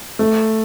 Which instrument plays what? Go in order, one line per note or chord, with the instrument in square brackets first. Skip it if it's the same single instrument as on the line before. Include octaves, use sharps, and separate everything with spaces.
[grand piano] A3